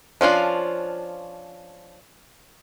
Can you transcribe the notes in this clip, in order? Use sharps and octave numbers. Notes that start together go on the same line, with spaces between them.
F3 C#4 D4 F4